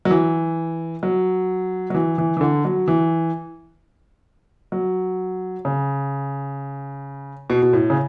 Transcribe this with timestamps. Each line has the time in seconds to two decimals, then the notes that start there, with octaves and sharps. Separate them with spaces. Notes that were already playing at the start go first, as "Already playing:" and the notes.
0.05 F#3
0.11 E3
1.03 F#3
1.90 F#3
1.95 E3
2.18 E3
2.37 E3
2.41 D3
2.65 F#3
2.88 E3
4.72 F#3
5.65 C#3
7.50 B2
7.63 B2
7.73 A2
7.90 C#3